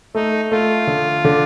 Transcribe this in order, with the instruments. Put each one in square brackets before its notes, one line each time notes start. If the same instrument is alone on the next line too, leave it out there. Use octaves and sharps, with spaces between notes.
[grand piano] A3 [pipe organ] D#4
[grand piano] A3 [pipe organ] F4
[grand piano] D3
D3